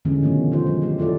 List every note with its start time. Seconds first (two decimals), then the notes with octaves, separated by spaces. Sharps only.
0.05 D3 E3 G3 G#3 C#4
0.22 B2 D#3 F3 A3 B3
0.51 C#3 E3 G#3 D#4 F4 C5
0.66 F#3 G#3
0.82 G3 A3 G4
0.98 E4 F4 A4 D5